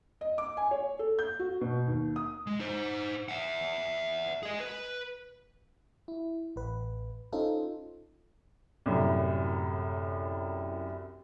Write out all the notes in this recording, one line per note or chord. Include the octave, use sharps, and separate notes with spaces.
D#5
D6
G#5
C#5
A4
G6
F#4
B2
D#2
D#6
G#3
D#4 C5
E5 F#5
G#4 D#5
B4
E4
A1 B4
C#4 D#4 F4 A4 C5
C2 F#2 A2